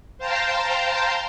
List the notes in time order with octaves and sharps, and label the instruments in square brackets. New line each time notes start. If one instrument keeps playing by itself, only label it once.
[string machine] C5 F5 G5 A5 A#5 C6